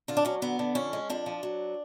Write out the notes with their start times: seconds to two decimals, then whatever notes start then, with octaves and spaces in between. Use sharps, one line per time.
0.08 D3 F4
0.17 D4
0.25 F#3 C#4
0.42 D3 B3
0.59 D3
0.75 F2 C#4
0.93 G#3
1.10 F2 D4
1.26 F3
1.43 F#3